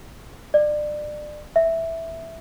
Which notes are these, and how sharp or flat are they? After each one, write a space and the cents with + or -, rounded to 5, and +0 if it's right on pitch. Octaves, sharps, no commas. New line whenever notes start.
D5 +25
E5 -5